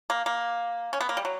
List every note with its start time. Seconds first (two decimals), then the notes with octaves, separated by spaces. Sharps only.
0.10 A#3
0.26 A#3
0.93 C#4
1.01 B3
1.09 A#3
1.17 G3
1.25 F#3